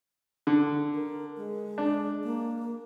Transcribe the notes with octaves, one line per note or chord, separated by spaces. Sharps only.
D3
A#4
G#3
D4
A#3